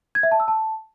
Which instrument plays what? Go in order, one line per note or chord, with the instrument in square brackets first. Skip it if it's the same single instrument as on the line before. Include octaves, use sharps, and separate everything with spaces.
[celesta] G#6
E5
A5
E6
A5